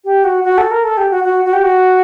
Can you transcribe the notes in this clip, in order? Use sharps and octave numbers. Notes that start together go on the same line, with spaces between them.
G4
F#4
F#4
A4
A#4
A4
G4
F#4
F#4
F#4
G4
F#4